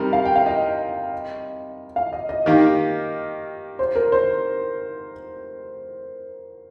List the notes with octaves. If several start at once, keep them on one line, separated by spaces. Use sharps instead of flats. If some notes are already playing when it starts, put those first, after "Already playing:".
Already playing: C3 G3 D#4 A#4
F5
G5
F5
D#5
F5
D#5
D#5
D#3 A#3 G4
C5
A#4
C5